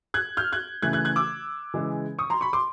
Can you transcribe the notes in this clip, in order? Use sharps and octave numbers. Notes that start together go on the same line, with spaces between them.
F#6 G#6
F6 G6
F#6 G#6
C#3 E3 A3 F#6 G#6
F#6 G#6
F#6 G#6
D6 E6
C#3 E3 G#3
C#6 D#6
A#5 C6
B5 C#6
C6 D6